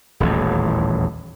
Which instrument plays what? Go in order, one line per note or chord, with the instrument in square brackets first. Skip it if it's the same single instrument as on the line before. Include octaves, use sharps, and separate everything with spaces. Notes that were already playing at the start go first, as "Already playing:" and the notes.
[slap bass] D#1 A1 E2